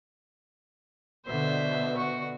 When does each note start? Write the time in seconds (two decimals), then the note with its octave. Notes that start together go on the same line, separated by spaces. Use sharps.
1.26 B2 D3 C5 E5
1.96 F#4 C#6